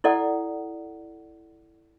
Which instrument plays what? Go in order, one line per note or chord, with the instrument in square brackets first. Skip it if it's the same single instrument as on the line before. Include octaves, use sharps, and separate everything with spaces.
[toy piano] E4 A4 D5 F#5